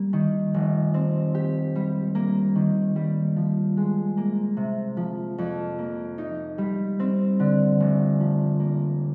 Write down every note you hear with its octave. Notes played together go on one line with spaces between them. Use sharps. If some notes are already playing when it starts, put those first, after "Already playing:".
Already playing: G3 A#3
D#3
F1
C4
G4
G3
A#3
D#3
G3
F3
G#3
A#3
C3
F3
F2
A#3
D#4
G3
C4
D3
F1
F3
A#3